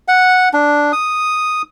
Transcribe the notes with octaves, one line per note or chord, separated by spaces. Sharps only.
F#5
D4
D#6